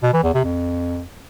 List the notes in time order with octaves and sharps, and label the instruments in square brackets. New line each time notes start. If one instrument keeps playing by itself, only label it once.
[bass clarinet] B2
E3
E2
C3
F2